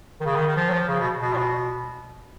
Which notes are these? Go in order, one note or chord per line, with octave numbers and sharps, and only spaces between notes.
D#3
C#3
D#3
D#3
F3
F#3
F3
C#3
B2
B2
A#2
B2